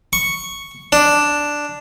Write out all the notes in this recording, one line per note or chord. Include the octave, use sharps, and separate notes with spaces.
C#6
D4